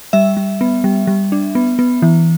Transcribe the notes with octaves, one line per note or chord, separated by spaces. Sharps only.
G3 E5
G3
B3
G3
G3
D4
B3
B3
E3